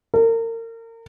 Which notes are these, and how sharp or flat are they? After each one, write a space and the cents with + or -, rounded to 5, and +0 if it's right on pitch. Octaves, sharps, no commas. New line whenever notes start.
A#4 -35